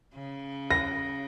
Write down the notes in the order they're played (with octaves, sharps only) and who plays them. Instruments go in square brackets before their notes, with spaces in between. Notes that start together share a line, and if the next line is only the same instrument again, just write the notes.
[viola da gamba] C#3
[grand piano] A#6